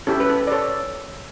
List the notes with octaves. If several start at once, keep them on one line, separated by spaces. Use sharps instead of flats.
C#4 E4 G4 A4
B4
A4
D5
A4 C#5